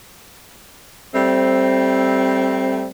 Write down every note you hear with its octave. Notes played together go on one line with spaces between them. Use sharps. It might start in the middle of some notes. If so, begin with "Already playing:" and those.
G3 A3 C4